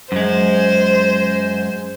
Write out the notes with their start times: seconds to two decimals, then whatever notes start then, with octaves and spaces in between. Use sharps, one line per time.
0.12 F#2 G#3 C5